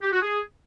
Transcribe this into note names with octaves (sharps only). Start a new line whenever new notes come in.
G4
F#4
G#4